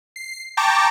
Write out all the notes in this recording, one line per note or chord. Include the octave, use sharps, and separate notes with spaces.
C7
G5 A5 A#5 C#6 D6